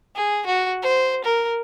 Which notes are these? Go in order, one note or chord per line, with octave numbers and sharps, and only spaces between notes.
G#4
F#4
C5
A#4